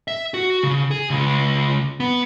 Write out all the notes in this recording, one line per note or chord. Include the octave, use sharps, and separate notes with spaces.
E5
F#4
C#3
G#4
C#2
B3